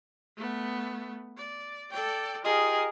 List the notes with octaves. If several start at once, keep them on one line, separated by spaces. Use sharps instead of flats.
A3 B3
D5
A4 D5 G5
F4 G4 G#4 A#4 D#5